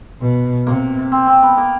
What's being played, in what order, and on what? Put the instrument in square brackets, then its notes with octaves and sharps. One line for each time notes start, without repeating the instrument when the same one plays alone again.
[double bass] B2
[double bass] C3 [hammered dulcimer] A#3
[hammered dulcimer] C4
C4
B3
A#3